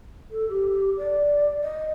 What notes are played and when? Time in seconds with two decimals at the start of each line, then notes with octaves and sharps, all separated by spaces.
0.31 A4
0.49 G4
0.97 D5
1.62 D#5